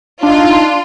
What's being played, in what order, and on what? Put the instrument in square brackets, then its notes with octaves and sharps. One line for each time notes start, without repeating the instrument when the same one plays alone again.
[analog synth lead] D4 [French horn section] D#4 [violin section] F4